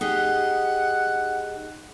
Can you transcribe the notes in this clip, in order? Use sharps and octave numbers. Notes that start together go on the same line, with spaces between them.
D#4 G4 G#4 F#5